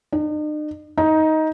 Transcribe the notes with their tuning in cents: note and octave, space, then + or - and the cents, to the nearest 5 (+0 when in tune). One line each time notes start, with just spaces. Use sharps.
D#4 -45
D#4 +15